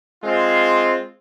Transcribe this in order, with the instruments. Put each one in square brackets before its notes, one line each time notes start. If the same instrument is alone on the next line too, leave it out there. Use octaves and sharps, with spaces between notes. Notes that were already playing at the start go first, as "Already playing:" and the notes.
[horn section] G#3 C4 F4